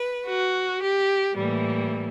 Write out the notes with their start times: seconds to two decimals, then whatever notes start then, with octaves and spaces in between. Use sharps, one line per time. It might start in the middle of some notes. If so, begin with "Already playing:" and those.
Already playing: B4
0.28 F#4
0.81 G4
1.34 A2 E3 G3 A#3